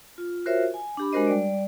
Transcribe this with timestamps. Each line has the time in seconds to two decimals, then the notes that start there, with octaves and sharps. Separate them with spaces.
0.18 F4
0.46 F4 F#4 A#4 C5 C#5 E5
0.74 G#5
0.97 D4 G4 B5
1.13 G#3 D4 F#4 A#4 C5 D#5
1.27 G3 D5